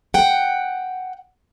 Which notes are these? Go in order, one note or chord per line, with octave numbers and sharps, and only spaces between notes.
F#5 G5